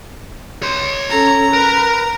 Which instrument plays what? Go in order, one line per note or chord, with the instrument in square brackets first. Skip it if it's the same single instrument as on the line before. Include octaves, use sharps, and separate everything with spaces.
[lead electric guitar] C#5 C6
[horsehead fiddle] C#4 A4 [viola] A#5
[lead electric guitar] A#4 [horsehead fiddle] B4